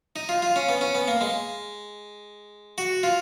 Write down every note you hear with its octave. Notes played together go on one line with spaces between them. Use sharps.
D#4
F4
F4
C#4
B3
C#4
B3
A#3
G#3
F#4
F4